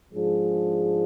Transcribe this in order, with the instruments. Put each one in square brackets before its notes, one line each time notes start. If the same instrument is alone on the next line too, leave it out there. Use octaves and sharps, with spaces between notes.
[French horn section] G#2 F3 G#3 D4 G#4